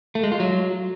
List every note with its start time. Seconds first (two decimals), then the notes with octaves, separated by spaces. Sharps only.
0.15 A3
0.23 G#3
0.32 F4
0.40 F#3